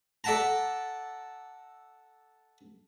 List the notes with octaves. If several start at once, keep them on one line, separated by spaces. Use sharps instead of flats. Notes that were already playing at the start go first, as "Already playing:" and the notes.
A4 D5 E5 F#5 A5 A#5